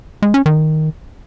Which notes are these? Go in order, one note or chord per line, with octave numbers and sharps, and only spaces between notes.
G#3
C#4
D#3